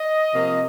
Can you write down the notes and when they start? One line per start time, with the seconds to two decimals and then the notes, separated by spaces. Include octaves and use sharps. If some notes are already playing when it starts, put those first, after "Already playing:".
Already playing: D#5
0.32 C3 F3 A#3